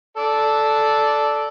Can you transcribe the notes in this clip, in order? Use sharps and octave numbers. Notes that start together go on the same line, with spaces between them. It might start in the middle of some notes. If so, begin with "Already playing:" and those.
A4 D5